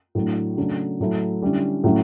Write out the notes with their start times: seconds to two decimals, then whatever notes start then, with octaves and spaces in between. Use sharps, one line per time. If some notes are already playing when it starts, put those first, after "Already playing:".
0.15 A2 F#3 A3 D4
0.57 C#3 F#3 A3 D4
1.00 A2 F#3 A3 E4
1.42 D3 G3 C#4 E4
1.84 A2 F#3 A3 C#4 E4